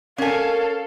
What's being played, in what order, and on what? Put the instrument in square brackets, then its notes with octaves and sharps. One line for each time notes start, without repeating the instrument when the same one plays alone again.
[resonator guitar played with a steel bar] C#4 G#5 [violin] A4 F5 [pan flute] A#4